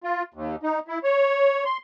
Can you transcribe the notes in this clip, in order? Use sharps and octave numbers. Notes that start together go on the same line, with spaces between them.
F4
D#2
D#4
E4
C#5
C6